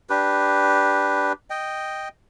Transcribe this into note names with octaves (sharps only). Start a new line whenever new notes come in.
D4 G4 B4
D#5 G5